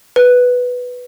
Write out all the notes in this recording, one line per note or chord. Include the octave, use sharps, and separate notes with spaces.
B4